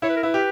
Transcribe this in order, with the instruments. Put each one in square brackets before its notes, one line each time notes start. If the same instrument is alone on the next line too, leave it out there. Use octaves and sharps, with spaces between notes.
[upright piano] E4 [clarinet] C#5
[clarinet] B4
A#4
[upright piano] E4 [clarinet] B4
[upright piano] G4